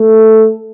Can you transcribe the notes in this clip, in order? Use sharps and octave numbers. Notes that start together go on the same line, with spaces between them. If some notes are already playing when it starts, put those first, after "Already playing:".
Already playing: A3